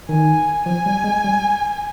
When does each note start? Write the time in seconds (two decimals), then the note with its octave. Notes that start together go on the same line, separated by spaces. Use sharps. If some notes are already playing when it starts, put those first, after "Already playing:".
0.09 D#3 G#5
0.66 F3 G#5
0.86 G3
1.04 G#3
1.24 G3